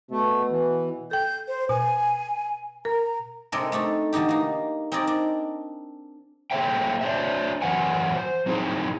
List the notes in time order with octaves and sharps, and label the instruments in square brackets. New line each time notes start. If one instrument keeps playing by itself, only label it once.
[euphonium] B2 [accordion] A3
[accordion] E3
[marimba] A4 G5 [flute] G6
[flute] C5
[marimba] B2 [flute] G#5
[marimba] A#4 [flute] A#5
[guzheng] C3 G#3 C4 D4 A4 A#4
A3 D4 D#4 A4
B2 D3 E3 D#4 G4
A#3 D#4
C4 D#4 G#4 A#4 D5
D4
[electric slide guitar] A#3 G#4 A4 C5 E5 G5
D4 C5 C#5 E5
F#2 E3 F#3 B4 F#5 G#5
C5
F#3 C4 D#4 E4 G#4